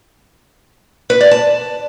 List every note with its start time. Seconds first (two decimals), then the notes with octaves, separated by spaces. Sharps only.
1.10 B4
1.21 D5
1.31 A5